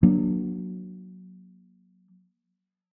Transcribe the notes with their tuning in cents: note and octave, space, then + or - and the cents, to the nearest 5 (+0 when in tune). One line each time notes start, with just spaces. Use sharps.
F#3 -5 A#3 +25 D4 +0